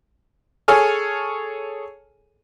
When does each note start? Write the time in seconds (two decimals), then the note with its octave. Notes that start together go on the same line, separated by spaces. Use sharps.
0.68 G#4 A4 C#5 G#5 F6